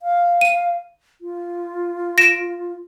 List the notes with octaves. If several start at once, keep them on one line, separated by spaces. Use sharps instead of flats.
F5
D#7
F4
A#6 D7 E7